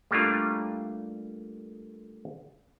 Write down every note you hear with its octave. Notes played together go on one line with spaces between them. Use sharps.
G3 A3 A#3 D4 F4